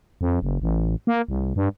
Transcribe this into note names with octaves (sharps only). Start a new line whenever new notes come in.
F2
F#1
A1
A#3
C2
G2